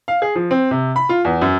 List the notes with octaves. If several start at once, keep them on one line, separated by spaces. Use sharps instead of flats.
F5
G#4
F3
C4
C3
B5
F4
E2
F#2